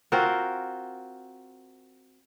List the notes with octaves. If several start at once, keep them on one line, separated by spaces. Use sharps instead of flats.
C4 F4 F#4 A#4